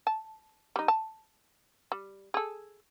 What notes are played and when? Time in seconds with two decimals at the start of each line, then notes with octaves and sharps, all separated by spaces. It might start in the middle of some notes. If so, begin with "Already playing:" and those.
0.07 A5
0.76 G3 D#4
0.88 A5
1.92 G3
2.34 G#4 A4